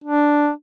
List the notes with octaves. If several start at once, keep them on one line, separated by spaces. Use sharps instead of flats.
D4